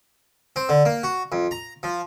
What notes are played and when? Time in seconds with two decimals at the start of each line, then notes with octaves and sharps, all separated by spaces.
0.56 C4
0.69 D3
0.85 A#3
1.03 F#4
1.32 F2
1.51 A#5
1.83 F3